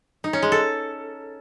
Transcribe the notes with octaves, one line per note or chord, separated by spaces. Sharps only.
D#4
C#4
G#3
A4